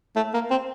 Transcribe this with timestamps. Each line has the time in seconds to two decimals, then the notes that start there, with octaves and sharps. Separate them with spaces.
0.16 A3
0.34 A#3
0.51 C4